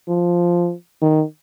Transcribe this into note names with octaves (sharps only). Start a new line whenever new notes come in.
F3
D#3